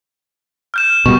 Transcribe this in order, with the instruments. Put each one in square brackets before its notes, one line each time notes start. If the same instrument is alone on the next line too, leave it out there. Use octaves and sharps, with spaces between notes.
[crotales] F6 G6 E7
[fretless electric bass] B2 G3 [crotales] C#6